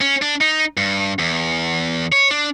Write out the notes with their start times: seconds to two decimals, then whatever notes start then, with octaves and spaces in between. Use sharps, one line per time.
0.01 C#4
0.22 D4
0.41 D#4
0.77 G2
1.19 E2
2.12 C#5
2.31 D4